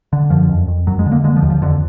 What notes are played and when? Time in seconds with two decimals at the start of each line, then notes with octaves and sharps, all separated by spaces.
0.13 D3
0.30 F#2 F3
0.49 F2
0.68 F2
0.87 F#2 F#3
0.99 G#3
1.06 D3
1.12 A#3
1.24 D3 G#3
1.36 F3
1.42 D#2
1.50 F3
1.61 F2 D3